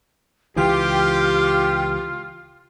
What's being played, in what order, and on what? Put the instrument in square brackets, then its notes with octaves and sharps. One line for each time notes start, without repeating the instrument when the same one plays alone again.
[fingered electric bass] C#2 E3 [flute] F4 [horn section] G4